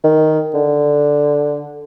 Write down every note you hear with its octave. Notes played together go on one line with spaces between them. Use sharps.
D#3
D3